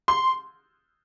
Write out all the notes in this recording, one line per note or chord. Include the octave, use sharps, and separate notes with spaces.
C6